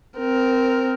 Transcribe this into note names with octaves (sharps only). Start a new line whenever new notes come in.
C4 A#4